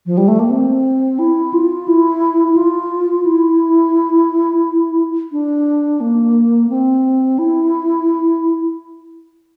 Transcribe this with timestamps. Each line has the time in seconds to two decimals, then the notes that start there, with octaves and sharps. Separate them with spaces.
0.06 F3
0.17 G3
0.28 A3
0.39 A#3
0.50 C4
1.19 E4
1.53 F4
1.88 E4
2.48 E4
2.57 F4
3.26 E4
5.32 D4
6.01 A#3
6.70 C4
7.39 E4